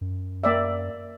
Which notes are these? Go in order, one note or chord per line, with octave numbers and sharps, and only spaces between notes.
F#2
A#3 D5 E5